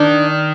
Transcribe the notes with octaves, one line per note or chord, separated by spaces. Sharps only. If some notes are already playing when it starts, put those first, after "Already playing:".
Already playing: D#3 D4